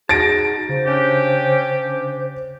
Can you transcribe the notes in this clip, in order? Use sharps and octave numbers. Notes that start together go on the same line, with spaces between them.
D#4 F#4 G#4 A5 A6 A#6 D7
C#3 C5
C#4 D4 G4